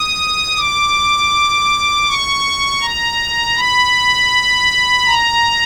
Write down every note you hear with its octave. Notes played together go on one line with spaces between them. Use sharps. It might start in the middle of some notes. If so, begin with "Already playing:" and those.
Already playing: D#6
D6
C#6
A#5
B5
A#5